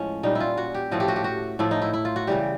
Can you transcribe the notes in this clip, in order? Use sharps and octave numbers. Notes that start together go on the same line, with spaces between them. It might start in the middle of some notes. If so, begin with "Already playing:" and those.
Already playing: A2 F3 G#3 C#4
A#2 G3 D#4
E4
F4
F#4
G4
A2 F3 A3 F#4
G4
F#4
G4
F#4
A2 F3 A3 E4
D#4
E4
E4
F4
F#4
C#3 E3 G3 G4